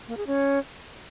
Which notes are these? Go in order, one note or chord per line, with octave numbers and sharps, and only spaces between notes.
A#3
G#4
C#4